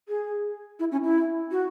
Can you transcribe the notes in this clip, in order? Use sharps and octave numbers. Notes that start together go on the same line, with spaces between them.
G#4
E4
C#4
E4
F#4